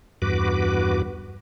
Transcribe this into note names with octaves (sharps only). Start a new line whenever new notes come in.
E2 G2 F#4 B4 D6